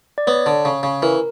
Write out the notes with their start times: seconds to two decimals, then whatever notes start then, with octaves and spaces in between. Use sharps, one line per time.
0.18 D5
0.27 B3 C#5
0.46 D3
0.65 C#3
0.83 C#3
1.02 E3 A#4